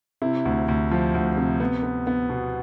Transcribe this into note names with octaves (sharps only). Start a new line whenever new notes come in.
C3 E4
D2
D2
F3
D2
C3
B3
B3
B3
B2